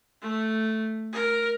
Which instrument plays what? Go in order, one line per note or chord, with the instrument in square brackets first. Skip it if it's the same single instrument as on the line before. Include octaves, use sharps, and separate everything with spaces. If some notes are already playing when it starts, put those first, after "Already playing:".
[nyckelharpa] A3
A#4